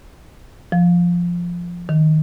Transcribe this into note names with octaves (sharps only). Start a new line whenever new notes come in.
F3
D#3